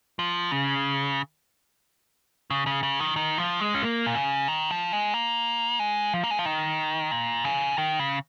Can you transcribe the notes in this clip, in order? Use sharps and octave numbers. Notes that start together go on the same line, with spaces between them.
F3
C#3
C#3
C#3
C#3
D#3
D#3
F3
G#3
C#4
A#3
A#2
C#3
D#3
F3
G#3
A#3
G#3
F3
A#3
G#3
F3
D#3
A#2
C#3
D#3
C#3